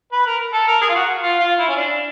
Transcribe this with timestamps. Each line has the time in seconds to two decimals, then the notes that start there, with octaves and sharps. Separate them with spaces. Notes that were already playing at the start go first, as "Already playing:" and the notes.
0.13 B4
0.27 A#4
0.53 A4
0.68 A#4
0.82 G#4
0.89 F4
0.95 F#4
1.23 F4
1.40 F4
1.59 E4
1.69 C#4
1.76 D4